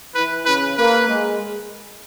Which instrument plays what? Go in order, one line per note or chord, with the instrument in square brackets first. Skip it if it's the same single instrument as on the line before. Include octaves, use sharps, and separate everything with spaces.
[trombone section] E3 [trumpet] B4
[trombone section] C#3 [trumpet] B4
[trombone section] A#3 [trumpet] B4
[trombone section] G#3